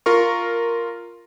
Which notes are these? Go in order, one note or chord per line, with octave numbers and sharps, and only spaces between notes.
F4 A#4 C#6